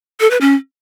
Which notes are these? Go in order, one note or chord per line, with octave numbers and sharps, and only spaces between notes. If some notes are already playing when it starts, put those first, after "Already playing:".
A4
B4
C#4